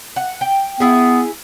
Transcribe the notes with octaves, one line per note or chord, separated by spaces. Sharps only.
F#5
G5
B3 E4 G#4